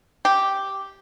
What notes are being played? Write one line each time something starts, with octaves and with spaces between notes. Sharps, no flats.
G4